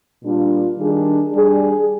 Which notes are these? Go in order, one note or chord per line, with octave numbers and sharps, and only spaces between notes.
A#2 G3 D4 F4
D#3 G3 D4 G#4
G3 D4 G#4